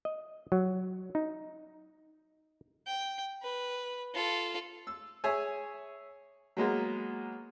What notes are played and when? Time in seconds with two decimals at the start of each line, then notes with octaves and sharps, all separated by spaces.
0.05 D#5
0.52 F#3
1.15 D#4
2.87 G5
3.42 B4
4.14 F4 A4
4.87 E6
5.24 G#4 C#5 E5 G#5
6.57 F#3 G#3 A#3 B3